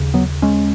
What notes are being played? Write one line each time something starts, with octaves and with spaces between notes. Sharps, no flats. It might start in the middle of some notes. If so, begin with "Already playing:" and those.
Already playing: D#2 C#3
F#3 B3
G#3 C#4